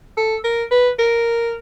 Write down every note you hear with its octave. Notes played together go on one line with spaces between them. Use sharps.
A4
A#4
B4
A#4